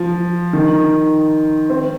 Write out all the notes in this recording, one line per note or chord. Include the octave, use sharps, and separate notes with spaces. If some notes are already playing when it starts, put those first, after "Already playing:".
Already playing: F3
D#3
C4